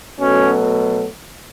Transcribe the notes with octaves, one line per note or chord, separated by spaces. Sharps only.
B2 F#3 A3 C#4